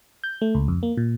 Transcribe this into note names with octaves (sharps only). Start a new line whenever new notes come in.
G6
A3
C#2
F2
A#3
A#2